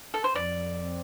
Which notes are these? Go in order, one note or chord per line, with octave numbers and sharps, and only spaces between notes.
A4
C5
F2 D5
C4